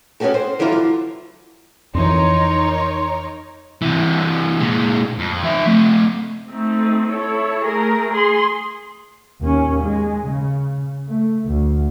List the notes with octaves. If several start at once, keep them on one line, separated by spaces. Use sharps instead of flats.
B3 C#4 D#4 F#4 G4 A4
C5
D3 E3 F#3 E4 F4 A4
D3 F#3
F2 E3 D#4 A#4 C#5 C6
C3 E3
A#2 G#3
F2
F3 E5
A3 C4
A3 C4 D#4
E4 A4 C#5
A3 G#4 A#4
G#4 C6
D#2 C#4
G#3
C#3
A3
D2